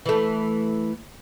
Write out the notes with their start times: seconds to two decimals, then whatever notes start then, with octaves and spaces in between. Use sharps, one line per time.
0.06 E3 A3